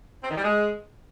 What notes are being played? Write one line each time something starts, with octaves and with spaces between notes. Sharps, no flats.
C4
D#3
G3
G#3